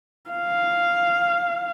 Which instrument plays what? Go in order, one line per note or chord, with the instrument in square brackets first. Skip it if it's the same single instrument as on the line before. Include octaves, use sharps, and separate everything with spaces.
[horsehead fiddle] F5